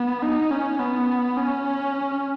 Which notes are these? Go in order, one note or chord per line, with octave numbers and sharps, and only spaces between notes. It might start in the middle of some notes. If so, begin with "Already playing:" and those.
Already playing: B3
D#4
C#4
B3
C#4